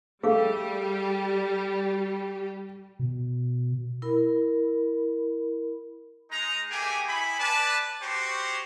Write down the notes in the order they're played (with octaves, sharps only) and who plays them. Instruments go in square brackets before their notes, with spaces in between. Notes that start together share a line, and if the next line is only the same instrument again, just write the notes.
[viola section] G3 G4 [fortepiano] A3 [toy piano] G#4 F5
[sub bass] B2
[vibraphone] E4 A#4 B5
[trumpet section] G#3 D#4 A#5
A3 A#3 G4 G#4 G5 G#5
D#4 E4 G#5 B5
B4 D5 A5
C4 F#4 G4 C5 C#5 C6